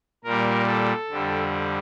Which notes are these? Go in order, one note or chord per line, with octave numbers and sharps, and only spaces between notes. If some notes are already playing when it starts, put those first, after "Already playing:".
A#2 G3 A#4
A4
F2 D3 G3